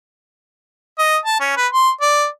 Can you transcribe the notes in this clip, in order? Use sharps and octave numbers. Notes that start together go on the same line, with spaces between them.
D#5
A5
C#4
B4
C6
D5